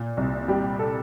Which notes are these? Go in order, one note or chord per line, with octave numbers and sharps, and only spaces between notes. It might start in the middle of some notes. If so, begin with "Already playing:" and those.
Already playing: A#2
C2
G3 G4
A4